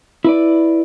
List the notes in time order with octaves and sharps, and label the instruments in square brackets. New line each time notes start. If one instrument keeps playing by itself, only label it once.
[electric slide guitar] E4 B4 D5